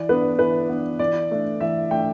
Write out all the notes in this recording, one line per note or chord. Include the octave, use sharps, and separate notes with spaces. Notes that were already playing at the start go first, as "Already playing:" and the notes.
Already playing: E3 D5
B3 D4 B4
E3 B4
B3 D4
E3 D5
A3 D4
E3 E5
A3 D4 G5